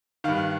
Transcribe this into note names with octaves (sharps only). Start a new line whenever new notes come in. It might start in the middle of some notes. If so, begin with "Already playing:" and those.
G2 D#3 F5